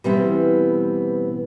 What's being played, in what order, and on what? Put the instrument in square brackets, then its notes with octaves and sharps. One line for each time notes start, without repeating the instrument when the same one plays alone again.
[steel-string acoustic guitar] B2 E3 G3 B3 C4